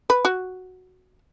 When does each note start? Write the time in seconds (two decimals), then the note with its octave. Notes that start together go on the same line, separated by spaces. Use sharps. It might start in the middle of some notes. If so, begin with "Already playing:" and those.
0.10 B4
0.25 F#4